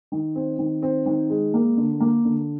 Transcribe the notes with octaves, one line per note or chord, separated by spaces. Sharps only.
D#3
C4
D#3
C4
D#3
G#3
A#3
D3
A#3
D3